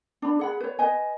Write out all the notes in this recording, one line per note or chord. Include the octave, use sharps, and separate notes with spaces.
D4 B5
G#4 F#5 B5
B4 C#5
B4 D#5 G#5